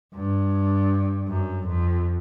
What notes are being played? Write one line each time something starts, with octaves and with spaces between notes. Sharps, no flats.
G2
F#2
F2